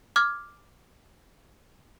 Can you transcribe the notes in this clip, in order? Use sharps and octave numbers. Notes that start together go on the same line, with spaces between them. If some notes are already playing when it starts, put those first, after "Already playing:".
D6 F6 G#6